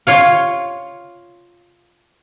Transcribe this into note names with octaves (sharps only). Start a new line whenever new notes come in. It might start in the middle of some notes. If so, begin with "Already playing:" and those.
F4 C#5 F5